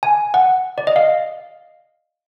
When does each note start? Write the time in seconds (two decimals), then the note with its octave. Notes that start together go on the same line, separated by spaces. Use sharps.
0.03 G#5
0.34 F#5
0.78 D5
0.87 D#5
0.96 F5